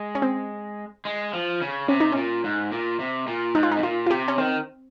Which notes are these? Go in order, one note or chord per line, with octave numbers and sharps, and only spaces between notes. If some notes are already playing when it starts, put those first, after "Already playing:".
Already playing: G#3
C#4
C4
G#3
F3
C#3
C3 C#4
D#4
A#2 C#4
G#2
A#2
C3
A#2
G#2 D#4
F4
D#4
C3
A#2 F4
F4
C3 G4
C#4
D#3 C4